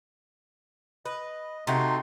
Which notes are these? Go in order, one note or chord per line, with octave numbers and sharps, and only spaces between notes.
B4 D#5
C3 A3 D#4 F#4 C6